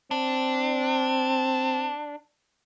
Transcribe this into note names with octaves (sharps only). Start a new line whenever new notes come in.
C4 D4